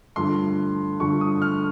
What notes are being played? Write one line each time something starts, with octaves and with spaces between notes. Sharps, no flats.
G2 D3 F3 A3 C6
G2 D3 F3 A3 C#6
D#6
F6